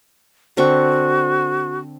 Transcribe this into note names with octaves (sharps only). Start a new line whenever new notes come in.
D3 C4 F#4 C#6